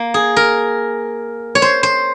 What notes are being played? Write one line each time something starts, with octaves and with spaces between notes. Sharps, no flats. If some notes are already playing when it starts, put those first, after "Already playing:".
Already playing: A#3
G#4
A#4
C#5
C5
C5